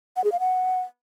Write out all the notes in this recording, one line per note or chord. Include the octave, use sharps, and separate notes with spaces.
F#5
G#4
F5
F#5